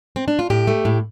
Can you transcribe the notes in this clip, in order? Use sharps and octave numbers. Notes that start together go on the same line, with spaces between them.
C4
D4
F4
A2 G4
A3
A2